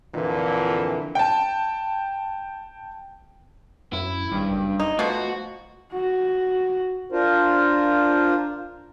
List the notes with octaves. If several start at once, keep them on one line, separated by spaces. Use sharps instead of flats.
F2 A#2 D3 E3
G5 A5
F#2 E4
G#1 G2
F#1
D#4
B2 F3 A3 F#4
F#4
D4 F4 A#4 C5